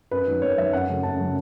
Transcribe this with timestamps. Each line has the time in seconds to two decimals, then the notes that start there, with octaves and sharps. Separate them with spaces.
0.11 F#2 B4
0.27 D#3 F#3
0.42 F#2 C#5
0.57 D#3 F#3 E5
0.73 F#2 F#5
0.88 C#3 F#3 A3
1.03 F#2 A5
1.19 C#3 F#3 A3